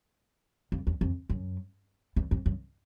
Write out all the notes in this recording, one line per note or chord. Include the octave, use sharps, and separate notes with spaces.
F2
E2
F2
F#2
E2
F2
F#2